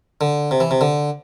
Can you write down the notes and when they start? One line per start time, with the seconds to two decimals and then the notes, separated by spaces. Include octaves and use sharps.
0.21 D3
0.51 C3
0.60 E3
0.71 C3
0.81 D3